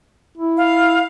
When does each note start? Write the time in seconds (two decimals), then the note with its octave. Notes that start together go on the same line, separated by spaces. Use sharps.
0.38 E4
0.57 F5